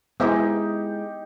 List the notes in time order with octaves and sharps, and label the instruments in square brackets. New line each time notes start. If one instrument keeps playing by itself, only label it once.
[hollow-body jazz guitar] G#3 E4 [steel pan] B3 [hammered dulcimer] D#4 G4 [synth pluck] C5 E5 G#5